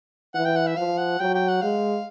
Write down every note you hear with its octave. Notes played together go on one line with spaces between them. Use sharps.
E3 F#5
G5
F#5
E5
F3 F5
F#5
F#3 G5
G5
F#5
G#3 F5